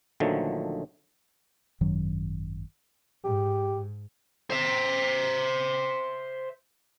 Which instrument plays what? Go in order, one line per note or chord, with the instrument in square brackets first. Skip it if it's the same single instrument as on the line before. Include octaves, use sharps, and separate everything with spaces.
[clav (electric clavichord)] A#1 D3 D#3 F3 F#3 A3
[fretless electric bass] G#1 F#2 D#3 F#3
[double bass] G#2 [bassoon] G4
[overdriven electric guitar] C5 E5